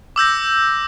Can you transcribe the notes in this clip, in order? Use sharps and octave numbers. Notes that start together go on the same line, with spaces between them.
D6 E6 G6 A#6